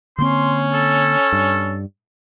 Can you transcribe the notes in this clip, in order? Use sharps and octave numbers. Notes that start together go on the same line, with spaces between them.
D3 A#3 C4 C#4 C6
A4
G2